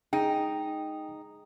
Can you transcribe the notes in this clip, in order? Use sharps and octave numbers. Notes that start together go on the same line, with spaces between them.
D#4 G#4 G5